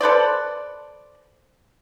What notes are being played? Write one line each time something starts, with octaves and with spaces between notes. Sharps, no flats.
A4 B4 C5 D5